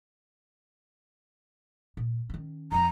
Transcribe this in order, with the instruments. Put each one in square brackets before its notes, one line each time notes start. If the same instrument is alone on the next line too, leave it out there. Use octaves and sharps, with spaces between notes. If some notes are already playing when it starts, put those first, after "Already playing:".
[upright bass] A#2
D#3 C#4
[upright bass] F2 F3 [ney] A#5